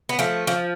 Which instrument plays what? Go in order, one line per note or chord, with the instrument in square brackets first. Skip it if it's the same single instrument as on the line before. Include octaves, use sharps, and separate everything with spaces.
[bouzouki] B3
F3 A3
F3